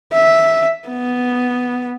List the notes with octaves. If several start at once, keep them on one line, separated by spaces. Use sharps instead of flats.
E5
B3